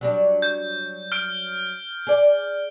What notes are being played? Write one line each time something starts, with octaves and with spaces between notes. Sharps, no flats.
F#3 G3 D4
G6
F6 D7
G#4 D5